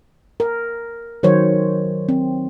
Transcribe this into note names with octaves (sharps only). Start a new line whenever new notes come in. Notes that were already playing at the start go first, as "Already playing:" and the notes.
A#4
D#3 F#3 C5 C#5
C4